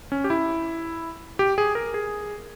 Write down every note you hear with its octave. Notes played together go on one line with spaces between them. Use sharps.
C#4
G4
E4
G4
G#4
A#4
G#4